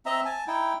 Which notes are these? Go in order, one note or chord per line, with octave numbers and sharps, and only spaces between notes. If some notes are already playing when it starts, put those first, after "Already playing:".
C4 D#5 E5 A#5
G#5 A5
D#4 E4 G5